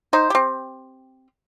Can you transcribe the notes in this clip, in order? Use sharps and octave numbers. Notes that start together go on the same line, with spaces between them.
D#4 C5
C4 G4